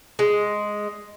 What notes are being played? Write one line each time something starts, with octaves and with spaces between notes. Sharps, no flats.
G#3